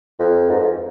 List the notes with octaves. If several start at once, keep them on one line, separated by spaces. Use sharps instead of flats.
F2
G#2
F2